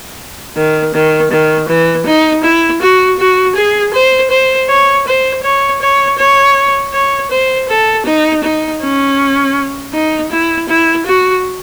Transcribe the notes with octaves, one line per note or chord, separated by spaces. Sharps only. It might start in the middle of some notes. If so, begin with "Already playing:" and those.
D#3
D#3
D#3
E3
D#4
E4
F#4
F#4
G#4
C5
C5
C#5
C5
C#5
C#5
C#5
C#5
C5
A4
D#4
D#4
C#4
D#4
E4
E4
F#4